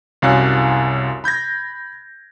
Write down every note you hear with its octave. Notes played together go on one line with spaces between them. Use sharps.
C2 F#2 C#5 F5 G#5 F#6
B5 G6 G#6 A#6